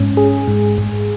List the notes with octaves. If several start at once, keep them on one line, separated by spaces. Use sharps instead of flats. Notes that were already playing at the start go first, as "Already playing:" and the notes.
Already playing: G#2 C#4
G#4
G#2
G#2